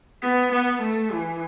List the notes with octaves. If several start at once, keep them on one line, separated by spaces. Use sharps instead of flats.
B3
B3
A3
E3